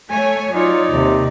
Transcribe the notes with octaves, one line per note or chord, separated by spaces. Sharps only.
A3 C#5 G#5
F#3 D#4 F4 C#5 D5
D#2 C3